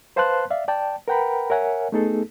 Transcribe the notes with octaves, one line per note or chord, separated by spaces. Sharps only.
B4 C5 F5 A5 C6 F#6
D5 E5 F5
D5 G5 A5
A#4 B4 F#5 G5 A#5 B5
A#4 C#5 E5 F#5 G#5
A3 B3 D#4 G#4 A4